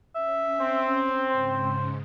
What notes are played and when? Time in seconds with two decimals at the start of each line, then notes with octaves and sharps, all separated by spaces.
0.15 C#4 E5
0.61 C4
1.28 G#2 C#3 C5